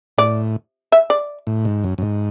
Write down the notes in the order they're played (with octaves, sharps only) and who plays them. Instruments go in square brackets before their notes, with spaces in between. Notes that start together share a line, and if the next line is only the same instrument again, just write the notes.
[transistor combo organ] A2 [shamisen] D5
[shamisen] E5
D5
[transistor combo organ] A2
G#2
F#2
F#2
G#2